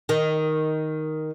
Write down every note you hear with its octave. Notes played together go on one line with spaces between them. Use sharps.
D#3